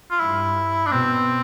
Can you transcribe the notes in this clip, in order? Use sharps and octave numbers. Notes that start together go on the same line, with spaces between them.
F4
G2 E4
D4
B2 C4